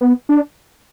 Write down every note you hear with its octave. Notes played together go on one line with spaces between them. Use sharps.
B3
D4